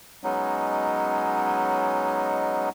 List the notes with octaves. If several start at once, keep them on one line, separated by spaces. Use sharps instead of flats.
F#3 G#3 B3 C#4 D#4